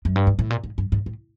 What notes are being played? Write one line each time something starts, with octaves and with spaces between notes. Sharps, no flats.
F#2
G2
G#2
A2
A#2
G#2
G2
G#2
A2